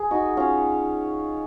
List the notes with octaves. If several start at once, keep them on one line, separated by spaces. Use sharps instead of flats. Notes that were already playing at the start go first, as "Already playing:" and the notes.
Already playing: G#4
D#4 F#4
C#4 F4